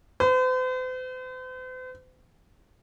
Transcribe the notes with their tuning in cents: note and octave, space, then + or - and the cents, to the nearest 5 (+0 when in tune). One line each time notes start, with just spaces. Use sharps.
C5 -45